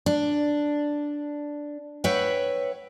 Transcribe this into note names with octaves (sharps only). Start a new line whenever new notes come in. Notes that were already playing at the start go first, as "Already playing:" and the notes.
D4
B4 C#5 E5 F#5 G5